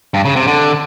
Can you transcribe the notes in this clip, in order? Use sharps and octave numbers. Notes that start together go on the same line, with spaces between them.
G2
C#3
C3
D3